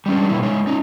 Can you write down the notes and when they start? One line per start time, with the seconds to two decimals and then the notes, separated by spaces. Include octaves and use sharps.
0.06 G3 G#3 C#4 D4
0.29 B2 A#3 E4
0.43 G#3 D#4 C#5
0.67 C#4 D#4